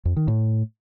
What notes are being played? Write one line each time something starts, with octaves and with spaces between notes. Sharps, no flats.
F2
D#3
A2